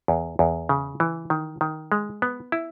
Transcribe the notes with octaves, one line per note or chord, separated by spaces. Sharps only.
E2
E2
C#3
E3
D#3
D#3
G#3
B3
E4